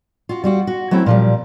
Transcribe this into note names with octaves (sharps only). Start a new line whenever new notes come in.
F4 F#4
G3 F4 F#4
F#4
F#3 A3 C4 E4 G5
A#2 F3 G3